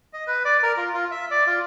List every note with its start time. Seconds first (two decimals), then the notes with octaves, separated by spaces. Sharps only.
0.13 D#5
0.27 B4
0.45 D5
0.63 A#4
0.77 F4
0.94 F4
1.11 E5
1.31 D5
1.47 F4